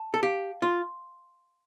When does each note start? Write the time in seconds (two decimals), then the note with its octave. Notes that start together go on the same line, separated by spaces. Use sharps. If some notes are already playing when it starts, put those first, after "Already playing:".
Already playing: A5
0.14 A4
0.23 G4 F5
0.62 F4 C6